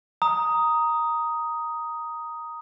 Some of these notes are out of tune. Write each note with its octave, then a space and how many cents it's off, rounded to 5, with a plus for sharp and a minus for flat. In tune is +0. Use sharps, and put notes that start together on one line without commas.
A#5 +0 D#6 +5